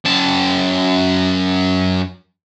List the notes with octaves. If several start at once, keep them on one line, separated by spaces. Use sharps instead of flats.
F#2 A5